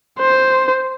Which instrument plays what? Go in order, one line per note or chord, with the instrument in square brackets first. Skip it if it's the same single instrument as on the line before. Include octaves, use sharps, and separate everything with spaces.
[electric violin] C5